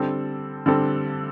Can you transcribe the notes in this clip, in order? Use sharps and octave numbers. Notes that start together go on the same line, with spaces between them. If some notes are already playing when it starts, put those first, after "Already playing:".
Already playing: D3 G3 C4 A4
D3 G3 C4 A4